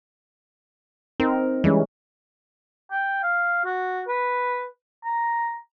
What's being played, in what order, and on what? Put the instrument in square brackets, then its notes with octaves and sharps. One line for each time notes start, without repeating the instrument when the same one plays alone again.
[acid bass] C4 [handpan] D#4 A#4
[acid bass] E3 [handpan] G3 G#3 C#4
[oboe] G5
F5
F#4
B4
A#5